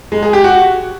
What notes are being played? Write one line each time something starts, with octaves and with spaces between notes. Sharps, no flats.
G#3
G#4
G4
F#4